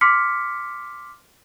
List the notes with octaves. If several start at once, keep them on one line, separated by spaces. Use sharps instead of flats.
C6 D6 F6 B6 C#7